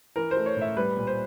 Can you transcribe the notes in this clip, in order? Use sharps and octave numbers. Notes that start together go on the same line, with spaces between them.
E3 A#4
C5
A3
C#5
A2
E5
G3 B4
A#2
C5